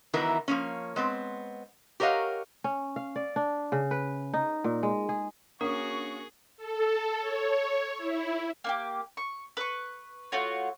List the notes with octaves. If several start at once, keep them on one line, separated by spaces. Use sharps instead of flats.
D#3 E3 F#3 B3 E4 A#4
F3 A#3 C#4
G#3 B3 C4
G4 A#4 C#5 D#5 F5 F#5
C#4
F5
D5
D4
C#3
B4
D#4
A#2
G#3
G#4
A#3 C#4 D4 F#4 G#4 A#4 C#6 D#6
A4
C#5
E4
A#3 E4 G4
C#6
B4 C#6
A3 F4 F#4 C#5